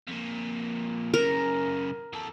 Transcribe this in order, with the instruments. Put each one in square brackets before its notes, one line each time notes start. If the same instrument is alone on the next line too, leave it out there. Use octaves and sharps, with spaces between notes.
[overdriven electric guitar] F2 A#2
[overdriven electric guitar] F#2 C#3 [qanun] A#4
[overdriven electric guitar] E2 A4